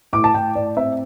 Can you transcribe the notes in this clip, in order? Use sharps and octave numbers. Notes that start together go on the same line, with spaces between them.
A2 D6
A5
A2 G5
A2 D5
C4 E5